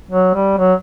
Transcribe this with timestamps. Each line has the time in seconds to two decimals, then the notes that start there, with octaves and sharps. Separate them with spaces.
0.11 F#3
0.35 G3
0.58 F#3